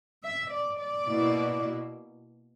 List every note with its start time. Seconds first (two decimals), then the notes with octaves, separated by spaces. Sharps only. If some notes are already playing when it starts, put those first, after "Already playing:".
0.23 E5
0.50 D5
0.78 D5
1.07 B2 A#3 E4